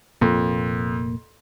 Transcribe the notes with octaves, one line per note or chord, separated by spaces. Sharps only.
F1 F2 A#2 A#3